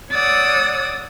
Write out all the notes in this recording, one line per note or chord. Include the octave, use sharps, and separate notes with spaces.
C#5 D5 F#5 D#6 E6